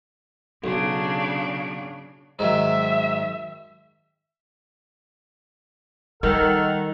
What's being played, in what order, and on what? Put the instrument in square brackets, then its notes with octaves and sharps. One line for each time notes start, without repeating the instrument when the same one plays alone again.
[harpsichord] B1 [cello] C#3 D4
[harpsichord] G#2 D#3 F#3 [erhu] E5
[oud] D#3 [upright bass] G3 [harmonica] A4 F#5 F6